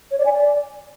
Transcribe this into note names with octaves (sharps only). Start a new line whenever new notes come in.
C#5
D5
G#5
D5